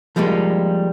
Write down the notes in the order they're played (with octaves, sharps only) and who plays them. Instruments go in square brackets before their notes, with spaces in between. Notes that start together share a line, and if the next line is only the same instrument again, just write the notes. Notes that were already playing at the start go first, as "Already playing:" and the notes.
[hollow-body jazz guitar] F3 G3 G#3 A#3 D#4